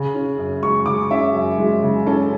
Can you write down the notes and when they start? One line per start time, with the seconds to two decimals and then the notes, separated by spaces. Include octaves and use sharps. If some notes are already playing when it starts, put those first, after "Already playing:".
Already playing: C#3
0.15 C#4
0.38 F#2
0.62 G#3 C#6
0.86 C#3 D6
1.11 C#4 E5
1.34 F#2
1.58 G#3
1.83 C#3
2.06 C#4 A4